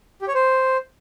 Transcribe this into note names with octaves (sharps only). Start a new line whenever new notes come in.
G4
C#5
C5